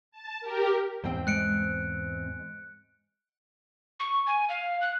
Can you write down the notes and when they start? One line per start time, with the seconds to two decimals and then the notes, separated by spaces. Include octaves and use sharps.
0.11 A5
0.40 G4 A#4
1.04 E2 G#2 C4 C5 G5
1.27 G#3 F#6 C#7 D7
4.00 C#6
4.27 G#5
4.49 F5
4.81 F#6